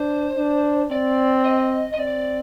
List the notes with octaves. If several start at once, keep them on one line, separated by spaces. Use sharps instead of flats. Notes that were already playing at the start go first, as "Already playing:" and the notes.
Already playing: D4 C5
D4
C4 D5
D#5
D#5
C4 D5